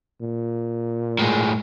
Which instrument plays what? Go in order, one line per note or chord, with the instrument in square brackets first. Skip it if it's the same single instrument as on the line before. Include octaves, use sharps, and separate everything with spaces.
[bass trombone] A#2
[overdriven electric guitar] A2 G#3